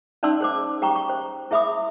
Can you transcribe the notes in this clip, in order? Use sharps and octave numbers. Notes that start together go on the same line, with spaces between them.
C#4 D#4 D5 A5 C6 E6
G#4 C5 D6
G4 G5 A#5 C#6
C#6
C5
E4 G#4 E5 B5 D6 D#6